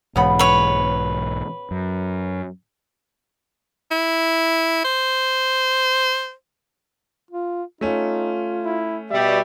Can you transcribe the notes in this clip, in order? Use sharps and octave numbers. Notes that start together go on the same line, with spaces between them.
B1 G#2 C#3 E3 B3 B5
B4 C#5
F#2
E4
C5
F4
A3 C#4 D#4 F4
E4
B2 G3 E5